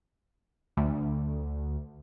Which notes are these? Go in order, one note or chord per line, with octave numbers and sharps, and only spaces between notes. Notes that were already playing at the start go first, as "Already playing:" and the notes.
D2